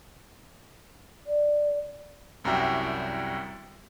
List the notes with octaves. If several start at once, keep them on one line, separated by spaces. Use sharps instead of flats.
D5
C2 F#2 G3 E4 F#4 G5